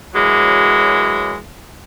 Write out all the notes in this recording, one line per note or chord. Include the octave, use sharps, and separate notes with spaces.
F#2 E3 F#3 G#3